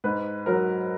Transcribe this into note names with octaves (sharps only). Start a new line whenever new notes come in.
G#2 B4
F#3 A#4